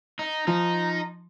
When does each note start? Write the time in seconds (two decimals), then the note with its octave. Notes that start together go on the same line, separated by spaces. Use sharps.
0.19 D#4
0.47 F3 D#4